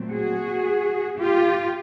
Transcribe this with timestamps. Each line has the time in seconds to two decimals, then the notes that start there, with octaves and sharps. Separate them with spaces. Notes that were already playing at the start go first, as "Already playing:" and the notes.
Already playing: A#2 F#3 A3 C4
0.12 F#4 G#4
1.18 F4 G4